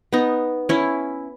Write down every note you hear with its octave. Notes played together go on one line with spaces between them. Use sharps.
B3 D#4
C#4 E4